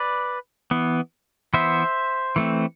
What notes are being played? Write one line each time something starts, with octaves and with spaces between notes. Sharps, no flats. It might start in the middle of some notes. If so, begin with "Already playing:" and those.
Already playing: B4 D5
E3 B3
E3 B3 C5 E5
E3 A3 C4